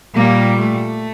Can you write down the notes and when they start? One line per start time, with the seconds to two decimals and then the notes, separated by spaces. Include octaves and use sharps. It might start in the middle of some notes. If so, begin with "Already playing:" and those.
0.15 A#2 G3 A#3
0.59 A3